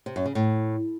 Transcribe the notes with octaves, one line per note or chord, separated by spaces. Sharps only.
C3
F#2
C#3
A2